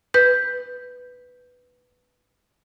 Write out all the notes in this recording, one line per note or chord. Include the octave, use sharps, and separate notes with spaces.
B4 G6